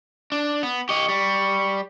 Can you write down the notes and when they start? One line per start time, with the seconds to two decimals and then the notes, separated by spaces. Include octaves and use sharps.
0.32 D4
0.63 B3
0.89 G4 D#5 C#6
1.09 G3